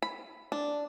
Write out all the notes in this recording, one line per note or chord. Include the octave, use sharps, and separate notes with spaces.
B5
D4